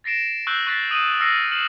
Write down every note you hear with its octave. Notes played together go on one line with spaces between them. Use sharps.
A6 A#6 C7 D7 E7
C#6 E6 F#6 G6 C7 F#7
C#6 F#6 A6 B6 C7
D#6 C7 D#7 E7 F#7
E6 F6 A#6 C7 C#7
F6 C7 C#7 E7 F#7